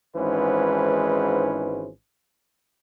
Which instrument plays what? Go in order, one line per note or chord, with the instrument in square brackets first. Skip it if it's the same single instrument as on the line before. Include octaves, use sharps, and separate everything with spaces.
[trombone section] G#1 G#2 E3 C#4 B4 C5